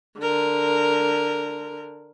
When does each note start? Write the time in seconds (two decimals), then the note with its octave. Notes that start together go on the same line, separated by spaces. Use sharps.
0.19 D3 A#4